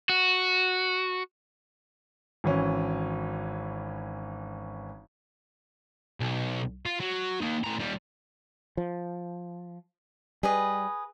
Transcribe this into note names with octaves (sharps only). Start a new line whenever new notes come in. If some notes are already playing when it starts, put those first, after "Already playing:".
F#4
G#1 E3 C#4
B1
F4
F#3
A#3 D#4
A2 A#5
D#2 G3
F3
G3 G#4 B4 D#5